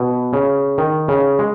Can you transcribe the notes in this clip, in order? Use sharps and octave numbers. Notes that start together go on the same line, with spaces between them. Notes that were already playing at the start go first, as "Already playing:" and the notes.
Already playing: B2
C#3
D#3
C#3
G#3